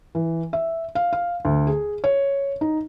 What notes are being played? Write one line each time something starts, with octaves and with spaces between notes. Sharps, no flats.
E3
E5
F5
F5
D2
G#4
C#5
D#4